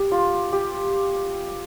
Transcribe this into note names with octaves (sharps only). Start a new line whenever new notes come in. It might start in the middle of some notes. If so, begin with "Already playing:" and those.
Already playing: G4
F4
G4